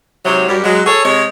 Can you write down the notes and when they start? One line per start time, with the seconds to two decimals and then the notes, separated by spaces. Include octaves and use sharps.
0.25 G#2 C3 F#3
0.48 F#2 G3
0.64 F#3 G#3
0.86 G#4 A4 C#5
1.04 C3 G#3 C#5